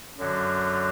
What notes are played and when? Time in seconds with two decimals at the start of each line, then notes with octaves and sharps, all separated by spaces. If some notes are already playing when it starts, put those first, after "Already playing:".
0.18 F#2 D3 F#3